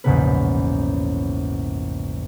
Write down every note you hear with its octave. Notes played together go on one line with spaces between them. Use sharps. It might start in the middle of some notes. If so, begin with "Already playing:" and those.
A#1 E2 G#2 C#3 B3 B4